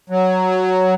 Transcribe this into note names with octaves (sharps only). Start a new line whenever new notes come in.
F#3